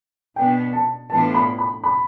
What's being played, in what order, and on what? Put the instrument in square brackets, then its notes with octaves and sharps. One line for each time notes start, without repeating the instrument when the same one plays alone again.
[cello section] B2 B3 D4 [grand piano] G5
[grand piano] A5
[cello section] A2 E3 B3 D4 F4 [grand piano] A5
[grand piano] B5
B5
B5